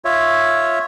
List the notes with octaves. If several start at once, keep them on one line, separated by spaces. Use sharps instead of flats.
F4 C#5 E5